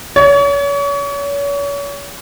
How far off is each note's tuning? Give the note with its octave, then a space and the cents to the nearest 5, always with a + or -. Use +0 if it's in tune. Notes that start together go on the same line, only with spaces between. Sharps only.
C#5 +35